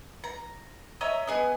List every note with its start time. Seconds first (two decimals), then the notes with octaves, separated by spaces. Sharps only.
0.24 A#5
1.01 C#5 D#5 E5 A#5
1.27 B3 G#4 D#5